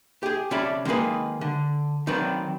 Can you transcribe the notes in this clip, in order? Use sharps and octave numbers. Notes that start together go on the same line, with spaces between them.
G4 G#4
C3 C#4 C#5 D5 A5 B5
D#3 G#3 A#3 G#4 B4
D3
D#3 F#3 C4 D4 B4